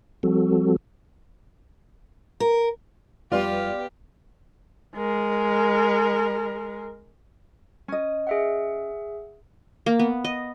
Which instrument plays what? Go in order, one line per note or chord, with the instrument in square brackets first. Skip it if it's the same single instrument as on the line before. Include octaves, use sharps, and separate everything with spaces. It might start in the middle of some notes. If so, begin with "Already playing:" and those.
[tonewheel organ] F3 G3 C4 F#4 A4
[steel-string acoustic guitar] A#4
[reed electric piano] F2 G3 [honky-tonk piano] B3 D5 F7 [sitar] F4 [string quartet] G4
[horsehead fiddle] G#3 A#4
[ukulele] C#4 D#5
[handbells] G#4 E5 F#5
[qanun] A#3
B3
D#5